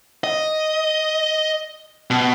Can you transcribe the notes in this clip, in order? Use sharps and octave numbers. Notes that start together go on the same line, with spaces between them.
D#5
B2